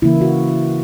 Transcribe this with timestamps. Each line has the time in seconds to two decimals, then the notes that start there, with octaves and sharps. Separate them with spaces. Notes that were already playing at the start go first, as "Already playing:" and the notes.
0.02 C#3 E3 A#3 E4
0.21 F#4